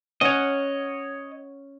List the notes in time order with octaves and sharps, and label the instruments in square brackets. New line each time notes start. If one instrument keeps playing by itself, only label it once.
[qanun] C#4 F#5 [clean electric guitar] C#5 D#5